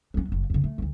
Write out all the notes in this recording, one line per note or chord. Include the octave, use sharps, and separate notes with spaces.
F#3 C#4
F#1 F#3
F2 C#3
A3
D2 F3